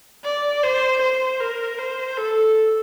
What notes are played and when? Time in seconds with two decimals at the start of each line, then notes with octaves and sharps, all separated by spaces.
0.24 D5
0.63 C5
1.01 C5
1.40 A#4
1.79 C5
2.17 A4